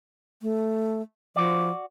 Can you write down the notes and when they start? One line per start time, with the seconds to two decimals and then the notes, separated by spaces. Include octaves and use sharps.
0.42 A3
1.36 F3 F#4 D5